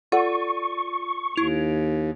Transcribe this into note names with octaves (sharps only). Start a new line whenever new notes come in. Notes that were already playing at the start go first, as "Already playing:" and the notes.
F4 A4 D5 F#5 C#6
D#2 E4 F7